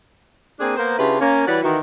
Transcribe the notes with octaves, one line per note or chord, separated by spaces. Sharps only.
A#3 C4 D4 G#4
A#3 B3 C5
C#3 D4 E4 F4 G4 B4
A#3 C#4
E3 G3 F#4 B4 C#5 D5
D#3 E3 F#4